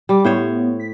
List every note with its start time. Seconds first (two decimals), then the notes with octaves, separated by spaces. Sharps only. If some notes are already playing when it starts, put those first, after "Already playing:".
0.09 G3 D6
0.25 A2 B3 C5 C#5
0.80 B6